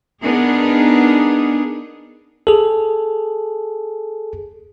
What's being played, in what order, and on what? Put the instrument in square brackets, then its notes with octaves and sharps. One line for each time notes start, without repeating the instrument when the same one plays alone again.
[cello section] B3 D4 D#4 G#4 A#4
[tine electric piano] G#4 A4